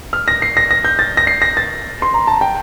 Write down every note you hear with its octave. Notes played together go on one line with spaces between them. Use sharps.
F6
A#6
C7
A#6
A#6
G6
A6
A#6
C7
A#6
A6
C6
A#5
A5
G5